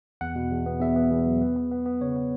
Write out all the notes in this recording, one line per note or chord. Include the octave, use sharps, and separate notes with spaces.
E2 F#5
B2
E2
B3
E2 E5
B3
E2
F#3
B3
B3
B3
B3
C#3 C#5
B3